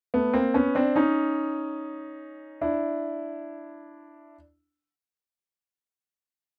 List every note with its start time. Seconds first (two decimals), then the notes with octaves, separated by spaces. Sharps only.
0.14 A3 B3
0.34 A#3 C4
0.54 B3 C#4
0.75 C4 D4
0.96 C#4 D#4
2.61 D4 E4